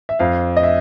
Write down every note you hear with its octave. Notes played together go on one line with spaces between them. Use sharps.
E5
F2 F5
D#5
E5